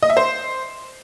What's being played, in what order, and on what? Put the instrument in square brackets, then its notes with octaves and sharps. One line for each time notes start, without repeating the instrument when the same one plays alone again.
[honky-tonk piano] D#5
E5
C5